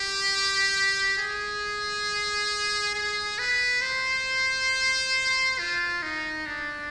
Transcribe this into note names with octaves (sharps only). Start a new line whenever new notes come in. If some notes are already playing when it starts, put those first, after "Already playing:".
Already playing: G4
G#4
G#4
B4
C5
F4
D#4
D4